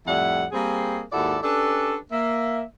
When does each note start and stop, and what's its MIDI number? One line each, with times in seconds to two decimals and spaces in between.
0.07 0.45 41
0.07 0.45 45
0.07 0.45 55
0.07 0.45 64
0.07 0.45 78
0.52 1.02 55
0.52 1.02 58
0.52 1.02 60
0.52 1.02 68
1.12 1.36 39
1.12 1.36 44
1.12 1.36 64
1.12 1.36 66
1.12 1.36 69
1.12 1.36 74
1.43 1.96 61
1.43 1.96 62
1.43 1.96 67
1.43 1.96 69
1.43 1.96 71
1.43 1.96 74
2.11 2.62 58
2.11 2.62 76